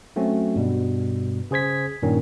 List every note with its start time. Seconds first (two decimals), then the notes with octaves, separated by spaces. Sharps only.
0.16 F#3 A3 C4 C#4 F#4
0.56 G2 B2 G3
1.51 C#3 G#4 C5 G#6 B6
2.02 G2 A#2 D#3 C#4